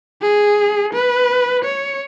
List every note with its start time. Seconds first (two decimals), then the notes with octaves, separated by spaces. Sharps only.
0.22 G#4
0.93 B4
1.65 C#5